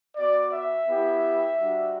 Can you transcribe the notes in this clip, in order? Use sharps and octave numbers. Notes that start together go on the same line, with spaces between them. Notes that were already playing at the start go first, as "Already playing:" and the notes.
B3 F#4 D5
E5
B3 E4 G4
G3 D4 F#4